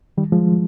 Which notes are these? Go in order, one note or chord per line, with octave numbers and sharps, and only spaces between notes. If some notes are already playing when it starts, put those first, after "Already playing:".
D#3 G3
F3 G#3